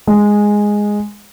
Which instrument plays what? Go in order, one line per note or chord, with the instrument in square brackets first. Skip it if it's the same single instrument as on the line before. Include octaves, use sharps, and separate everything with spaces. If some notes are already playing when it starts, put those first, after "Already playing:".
[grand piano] G#3